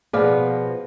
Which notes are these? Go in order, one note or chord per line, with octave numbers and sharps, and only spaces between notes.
B2 F3 B3 G#4 D5 F5